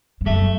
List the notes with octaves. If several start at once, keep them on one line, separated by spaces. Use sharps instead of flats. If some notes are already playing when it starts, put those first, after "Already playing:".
G2
F#2 A3